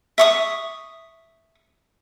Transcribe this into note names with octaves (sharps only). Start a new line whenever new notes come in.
E5 C#6 D#6